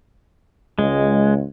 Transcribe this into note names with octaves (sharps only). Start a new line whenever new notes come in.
C#2 G#3